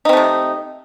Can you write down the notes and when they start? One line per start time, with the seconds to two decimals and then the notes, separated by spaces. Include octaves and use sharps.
0.05 D#4
0.09 C4
0.13 A3
0.17 C3